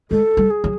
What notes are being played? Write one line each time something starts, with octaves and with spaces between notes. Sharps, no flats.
G#3 A4
G3
G#4
F#3